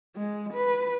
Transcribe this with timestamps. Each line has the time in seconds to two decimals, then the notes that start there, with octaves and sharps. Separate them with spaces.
0.16 G#3
0.53 B4